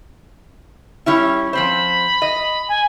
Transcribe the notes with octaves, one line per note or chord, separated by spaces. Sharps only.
G3 C#4 E4
F3 C4 C5 B5
D#5
G#5